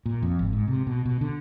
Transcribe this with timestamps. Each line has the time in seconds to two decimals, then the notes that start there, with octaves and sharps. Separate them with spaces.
0.06 A#2
0.22 F2
0.39 G#1
0.53 G#2
0.68 C3
0.87 B2
1.05 B2
1.21 D3